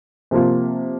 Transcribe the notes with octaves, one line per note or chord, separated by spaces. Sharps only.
C3 F3 A#3 F4